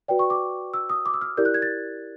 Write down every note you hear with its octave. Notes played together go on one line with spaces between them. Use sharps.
F#4 B4 D5 G5
C#6
D6
E6
D#6
D6
E6
F6
E4 G4 A#4 D5 G6
F#6
G#6
A6